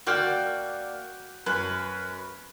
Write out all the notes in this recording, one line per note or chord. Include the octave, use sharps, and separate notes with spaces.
A#3 F#4 D5 G5 F6
F#2 B4